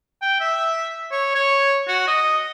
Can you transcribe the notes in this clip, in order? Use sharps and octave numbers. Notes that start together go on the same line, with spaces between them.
G5
E5
C#5
C#5
F#4
D#5